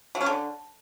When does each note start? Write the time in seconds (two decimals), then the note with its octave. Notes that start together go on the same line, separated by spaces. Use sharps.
0.15 F#3
0.21 C#4
0.26 D3